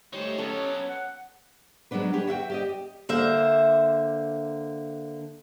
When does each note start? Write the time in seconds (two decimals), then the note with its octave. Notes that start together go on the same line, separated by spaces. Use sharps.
0.13 G3 A3 D#4 C5 C#5
0.38 F#3 B3 C#4 A4 D#5
0.88 F#5
1.91 F#3 G#3 B3 D4 B4
2.13 D4 G4 C#5
2.27 F#4 E5 F#5 G5
2.50 G4 D5 D#5
3.09 D3 A#3 C5 E5